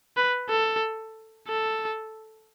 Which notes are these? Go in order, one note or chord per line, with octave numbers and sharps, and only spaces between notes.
B4
A4
A4